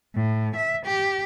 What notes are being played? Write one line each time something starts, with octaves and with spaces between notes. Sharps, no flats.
A2
E5
G4